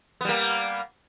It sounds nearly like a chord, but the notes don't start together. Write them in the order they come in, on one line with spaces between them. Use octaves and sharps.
B3 G3 A#3